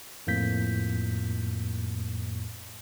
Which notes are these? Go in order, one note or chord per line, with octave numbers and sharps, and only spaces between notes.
F2 A2 A#3 G6 B6